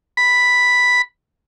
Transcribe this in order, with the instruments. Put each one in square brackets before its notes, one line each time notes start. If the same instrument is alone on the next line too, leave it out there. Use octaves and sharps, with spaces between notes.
[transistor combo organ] B5